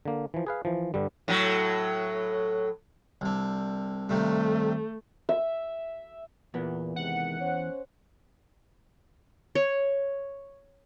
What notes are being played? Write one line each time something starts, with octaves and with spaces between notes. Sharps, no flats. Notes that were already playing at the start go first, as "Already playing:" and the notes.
D3 A#3
E3 F3
G#4 B4 F5
E3 F3
G2 D3 G3
A2 F#3
C2 D3
G2 C3 D#3 A3
E5
E2 A#2 B3
C3 D#3 G#3 F#5
C#4 C5 C#5
C#5